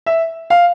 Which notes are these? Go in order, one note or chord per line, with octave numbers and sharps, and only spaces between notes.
E5
F5